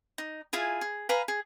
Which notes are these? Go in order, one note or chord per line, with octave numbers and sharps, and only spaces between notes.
D#4
E4 F4 G#4 G#5
G#4
B4 F5 G#5 A#5
G#4